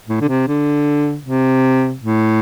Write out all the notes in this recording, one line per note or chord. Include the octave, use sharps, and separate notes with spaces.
A2
D3
C3
D3
C3
A2